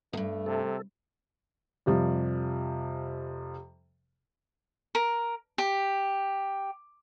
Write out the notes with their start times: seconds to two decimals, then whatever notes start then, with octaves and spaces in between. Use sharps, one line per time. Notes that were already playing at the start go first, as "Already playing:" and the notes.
0.13 E2 G2 A3
0.46 C3 A4
1.86 F2 C3 F3 G3
4.95 A#4
5.58 G4